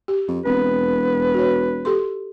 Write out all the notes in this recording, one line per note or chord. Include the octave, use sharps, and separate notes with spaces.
G4
F2
E1 C4 B4
F#4 C#5
G4 A4 C6